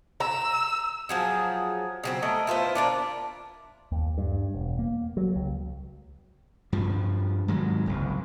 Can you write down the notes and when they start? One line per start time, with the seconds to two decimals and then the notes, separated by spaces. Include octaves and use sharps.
0.20 A#5 E6
1.09 F3 F#3 G#4
2.03 C#3 F#3 C4
2.22 A3 A#4 D#5
2.47 E4 F4 B4 C5
2.75 D4 F4 A#4
3.92 D#2
4.18 G2
4.54 E1
4.79 A#3
5.17 F#3
5.36 C#2
6.73 G2 F3
7.48 G#2 D#3 F#3
7.87 F#1 C2